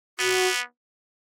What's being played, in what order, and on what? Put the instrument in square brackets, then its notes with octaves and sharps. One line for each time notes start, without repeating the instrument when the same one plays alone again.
[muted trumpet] B3 [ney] F#4